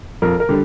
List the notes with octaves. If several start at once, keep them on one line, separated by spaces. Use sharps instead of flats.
F2 A#4
A#4
D3 G3